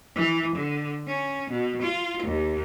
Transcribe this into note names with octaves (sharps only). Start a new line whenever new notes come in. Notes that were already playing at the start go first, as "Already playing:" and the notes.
E3
D3
C#4
B2
F4
D#2